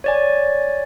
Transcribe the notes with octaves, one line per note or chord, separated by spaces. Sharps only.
C#5 D5 G#5